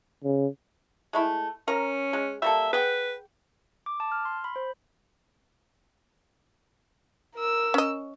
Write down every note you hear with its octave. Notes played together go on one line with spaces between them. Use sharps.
C#3
G#3 A3 E4
C#4 A#4 A#5
G#3
G3 A#3 A4 E5
G#4 B4 F#5 G5
D6
A5
F6
C6
B5
C5
A#4 E6
C#4 D#5